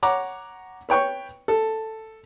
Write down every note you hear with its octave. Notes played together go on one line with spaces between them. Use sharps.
C#5 F#5 A#5 D6
B4 C#5 G5 C#6
A4